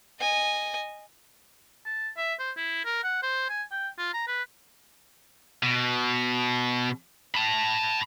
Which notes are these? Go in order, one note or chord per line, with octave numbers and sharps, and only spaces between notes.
D#5 G#5
A5
E5
C5
E4
A#4
F#5
C5
G#5
G5
F4
A#5
B4
B2
A5 B5